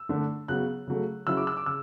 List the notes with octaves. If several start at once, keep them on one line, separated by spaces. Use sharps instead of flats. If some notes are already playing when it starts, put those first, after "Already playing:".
Already playing: E6
D3 A3 D4
C#3 F#3 B3 F#6
C#3 F#3 A3
C#3 F#3 C#4 E4 E6
D6
E6
D6
C#3 E6